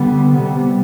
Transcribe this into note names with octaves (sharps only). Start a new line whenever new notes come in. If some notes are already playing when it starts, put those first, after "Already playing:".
Already playing: D3 G3 B3
C3 G3 B3